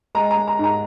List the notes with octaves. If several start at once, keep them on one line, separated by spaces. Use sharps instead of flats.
G#3 A#5
A#5
G#3
A#5
G#2 A#5